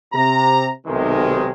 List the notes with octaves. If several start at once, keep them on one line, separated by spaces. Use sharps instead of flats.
C3 A#5
B1 C3 D#3 G#3